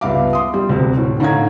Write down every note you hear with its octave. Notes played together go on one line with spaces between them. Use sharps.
C#2 G2 B3 E5 F5 D6
C6 D#6
G3
D2 C3
A2
A2 D3 D#4 F5 A#5 G#6